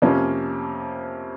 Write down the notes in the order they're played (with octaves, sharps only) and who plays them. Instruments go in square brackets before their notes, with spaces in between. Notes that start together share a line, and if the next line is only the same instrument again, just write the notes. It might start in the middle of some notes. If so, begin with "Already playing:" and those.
[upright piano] F2 C3 F3 A#3 C#4